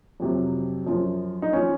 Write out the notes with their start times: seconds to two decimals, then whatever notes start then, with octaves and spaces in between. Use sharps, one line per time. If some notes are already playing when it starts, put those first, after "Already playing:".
0.20 F2 C3 F#3
0.87 F#2 F3
1.42 D#4
1.53 F3 C#4